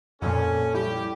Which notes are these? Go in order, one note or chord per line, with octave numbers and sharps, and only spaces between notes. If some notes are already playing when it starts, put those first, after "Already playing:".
F2 A#2 C#4 A4
G3 E4 G4